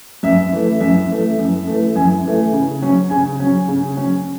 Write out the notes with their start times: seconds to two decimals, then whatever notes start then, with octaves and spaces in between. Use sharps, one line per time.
0.23 F#2 E5
0.53 E3 A3
0.81 F#2 E5
1.10 E3 A3
1.39 F#2
1.67 E3 A3
1.96 F#2 G#5
2.24 E3 A3
2.53 C#3
2.82 F#3 C#4
3.10 C#3 G#5
3.40 F#3 C#4
3.68 C#3
3.96 F#3 C#4